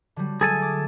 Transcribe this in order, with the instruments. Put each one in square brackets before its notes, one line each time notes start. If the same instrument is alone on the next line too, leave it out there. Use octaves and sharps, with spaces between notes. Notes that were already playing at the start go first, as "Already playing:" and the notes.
[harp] D3 F#3 G3
[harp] A3 [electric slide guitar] G#4 A4 G#5
[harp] D6 D#6